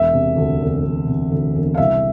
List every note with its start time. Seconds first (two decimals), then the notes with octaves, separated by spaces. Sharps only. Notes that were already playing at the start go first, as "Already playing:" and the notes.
Already playing: E1 E5
0.14 C3
0.37 D2
0.60 E1
0.84 E1
1.07 C3
1.31 D2
1.55 E1
1.74 F5
1.78 C2 E5